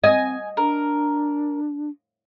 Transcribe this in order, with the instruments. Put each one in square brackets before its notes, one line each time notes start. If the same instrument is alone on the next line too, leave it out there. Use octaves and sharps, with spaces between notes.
[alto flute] C4 [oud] D#5 [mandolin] G#5
[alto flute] D4 [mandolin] A#4